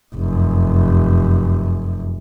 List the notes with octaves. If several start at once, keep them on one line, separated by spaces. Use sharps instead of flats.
F1 F#2